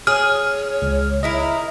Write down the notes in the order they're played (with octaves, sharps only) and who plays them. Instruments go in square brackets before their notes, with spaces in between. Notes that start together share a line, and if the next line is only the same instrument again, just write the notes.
[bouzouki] G#4 [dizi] C#5 [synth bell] F6
[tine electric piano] C#2
[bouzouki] G#3 E4 A#4 [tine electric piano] D#5